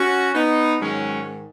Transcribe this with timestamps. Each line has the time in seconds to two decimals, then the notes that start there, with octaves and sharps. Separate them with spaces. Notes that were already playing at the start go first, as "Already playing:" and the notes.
Already playing: C#4 F#4
0.35 B3 D#4
0.80 G#2 D#3 F#3 G#3 C#4